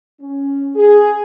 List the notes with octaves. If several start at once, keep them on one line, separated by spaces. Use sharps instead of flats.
C#4
G#4